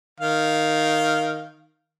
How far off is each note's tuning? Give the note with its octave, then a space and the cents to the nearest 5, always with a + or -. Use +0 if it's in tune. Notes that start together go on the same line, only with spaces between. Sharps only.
D#3 +0 F5 +0